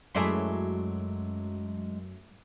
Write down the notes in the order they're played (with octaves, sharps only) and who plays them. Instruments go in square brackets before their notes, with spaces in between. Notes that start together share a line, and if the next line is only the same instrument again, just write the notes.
[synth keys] F#2 [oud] F#3 E4 G#4 [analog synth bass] G#3 [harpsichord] A3 D5 C6